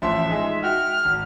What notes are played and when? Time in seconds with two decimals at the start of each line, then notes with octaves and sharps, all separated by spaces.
0.02 A1 F3 E5 C6
0.28 G#3 D#4 G#4
0.63 F#4 G5 F6
1.05 G#1